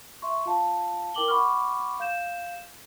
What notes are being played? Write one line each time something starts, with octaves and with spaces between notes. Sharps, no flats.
E5 C6 C#6
F4 F5 A5
E4 A#4 G5 D6 F#7 G7
F#5 B5 C#6 D6 F6
F5 G6 E7